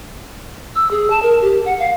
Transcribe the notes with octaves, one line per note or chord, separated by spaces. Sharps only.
E6
G#4
A5
A#4
G4
F#5
F5